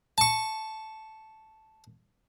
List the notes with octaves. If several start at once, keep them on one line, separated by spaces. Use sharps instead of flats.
A5 C#6